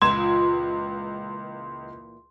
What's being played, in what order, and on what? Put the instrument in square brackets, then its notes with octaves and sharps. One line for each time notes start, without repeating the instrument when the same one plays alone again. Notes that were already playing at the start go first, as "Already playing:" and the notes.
[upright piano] C#2 G#6 E7 [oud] A#2 E3 F4 [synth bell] C6